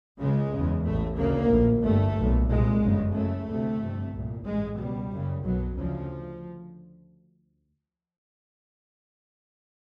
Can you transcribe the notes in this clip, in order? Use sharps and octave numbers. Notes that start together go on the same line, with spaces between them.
C#2 C#3 G#3
F#1 E2 C#3
A1 A2 A3
D2 C#3 A#3
A#1 A2
G1 G2 A3
B1 A#2
C2 A#2 G#3
G1 F#2 C#3
F#1 F#2 C#3 A3
D2 C3
G1 F2 C3
C2 A#2
A1 G#2 G#3
C#2 B2 G3
F#1 F#2 C#3
B1 B2 F#3
D2 C#3 F3